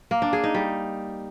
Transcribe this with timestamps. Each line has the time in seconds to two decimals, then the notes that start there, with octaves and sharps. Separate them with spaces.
0.11 A#3
0.22 D4
0.33 G#4
0.44 D#4
0.54 G3